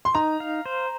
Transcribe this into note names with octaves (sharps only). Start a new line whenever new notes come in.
C6
D#4 A#5
F5
C5